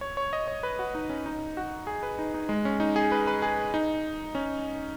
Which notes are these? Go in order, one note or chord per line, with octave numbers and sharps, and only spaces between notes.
C#5
C#5
D#5
C#5
B4
F#4
D#4
C#4
D#4
F#4
G#4
B4
D#4
D#4
G#3
C#4
D#4
G#4
B4
B4
G#4
D#4
C#4